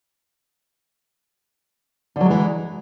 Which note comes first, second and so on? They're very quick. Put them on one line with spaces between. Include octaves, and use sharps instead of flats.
D3 F#3 G#3 E3